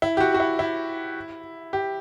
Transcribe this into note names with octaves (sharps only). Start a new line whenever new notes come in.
E4
G4
F#4
F#4
E4
E4
G4